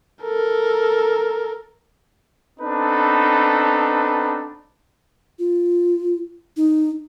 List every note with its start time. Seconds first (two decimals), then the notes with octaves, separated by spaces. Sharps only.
0.23 A4 A#4
2.59 B3 C4 D4 D#4 A4 B4
5.39 F4
6.57 D#4